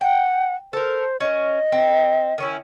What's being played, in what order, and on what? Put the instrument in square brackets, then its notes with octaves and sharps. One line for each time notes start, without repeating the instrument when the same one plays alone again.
[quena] F#5 [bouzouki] G5
[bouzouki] A4 A#4 [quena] C5
[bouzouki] C#4 A#4 [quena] D#5
[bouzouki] C4
D#3 C#4 E4